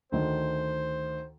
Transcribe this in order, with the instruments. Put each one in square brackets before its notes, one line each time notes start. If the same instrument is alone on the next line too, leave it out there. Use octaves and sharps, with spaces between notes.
[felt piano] D2 D#3 [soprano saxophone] C5